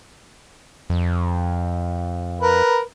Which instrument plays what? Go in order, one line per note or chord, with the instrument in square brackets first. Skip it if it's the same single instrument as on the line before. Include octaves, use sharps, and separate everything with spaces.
[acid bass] F2
[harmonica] A#4 B4